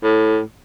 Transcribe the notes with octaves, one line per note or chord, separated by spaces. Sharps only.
A2